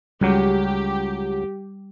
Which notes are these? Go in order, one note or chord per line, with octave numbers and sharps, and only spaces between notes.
C#2 F#3 G3 G4